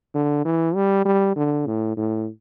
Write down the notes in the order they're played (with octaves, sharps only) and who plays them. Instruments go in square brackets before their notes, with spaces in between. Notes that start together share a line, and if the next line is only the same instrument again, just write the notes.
[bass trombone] D3
E3
G3
G3
D3
A2
A2